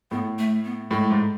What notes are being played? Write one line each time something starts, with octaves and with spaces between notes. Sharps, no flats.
A2 B3
A3
B3
A2 G#3
G#2